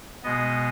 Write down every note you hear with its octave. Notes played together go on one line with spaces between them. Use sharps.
B2 G#3 B3 D#5